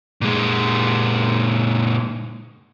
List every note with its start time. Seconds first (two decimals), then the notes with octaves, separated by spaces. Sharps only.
0.21 A#2 G#3